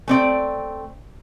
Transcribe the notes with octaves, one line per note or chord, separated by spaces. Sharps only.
A3 C4 D5